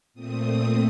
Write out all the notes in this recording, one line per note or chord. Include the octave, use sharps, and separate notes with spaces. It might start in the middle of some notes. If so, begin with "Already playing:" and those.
A#2 A3 C4 D#6